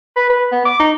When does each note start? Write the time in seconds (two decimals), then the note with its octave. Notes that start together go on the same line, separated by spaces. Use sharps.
0.16 B4
0.30 B4
0.52 B3
0.65 D6
0.79 D#4